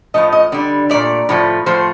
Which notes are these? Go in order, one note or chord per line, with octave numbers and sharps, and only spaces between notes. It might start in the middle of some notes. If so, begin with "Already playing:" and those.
A2 F3 A3 D#5
D#5
D3 G3 D5
A#2 A3 D5
A2 F3 A3
A2 F3 A3 C5